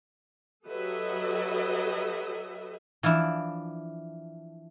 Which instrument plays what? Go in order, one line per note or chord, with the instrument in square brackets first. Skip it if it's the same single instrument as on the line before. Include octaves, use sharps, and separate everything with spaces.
[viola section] F#3 G4 A4 B4 D#5 E5
[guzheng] E3 F3 D4 E4